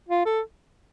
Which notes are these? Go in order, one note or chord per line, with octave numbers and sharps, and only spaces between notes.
F4
A4